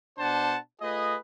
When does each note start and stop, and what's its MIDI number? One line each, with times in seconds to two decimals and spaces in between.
0.19 0.57 47
0.19 0.57 62
0.19 0.57 72
0.19 0.57 78
0.19 0.57 81
0.81 1.17 57
0.81 1.17 65
0.81 1.17 68
0.81 1.17 71
0.81 1.17 75